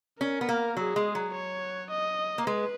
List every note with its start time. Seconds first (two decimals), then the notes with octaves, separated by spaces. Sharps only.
0.20 C#4 A#4
0.41 B3
0.49 A#3
0.77 F#3 G#4
0.96 G#3
1.15 F#3
1.34 C#5
1.90 D#5
2.38 A#3
2.47 G#3 B4